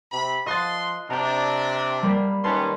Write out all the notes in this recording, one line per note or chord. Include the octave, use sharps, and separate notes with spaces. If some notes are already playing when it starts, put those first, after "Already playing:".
C3 B5
F3 D#5 C6 F#6 A6
C3 D4 A#5 G6
G3 A#3 B5
D#3 G3 C#4 B4 A5 C6